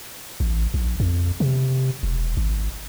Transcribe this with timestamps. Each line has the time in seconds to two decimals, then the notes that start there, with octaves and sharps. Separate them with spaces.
0.40 A1
0.74 A#1
1.00 F2
1.40 C3
2.03 E1
2.37 G#1